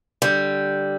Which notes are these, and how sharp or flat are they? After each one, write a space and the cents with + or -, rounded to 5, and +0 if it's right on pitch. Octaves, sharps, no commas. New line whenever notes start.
D3 +0 G3 +0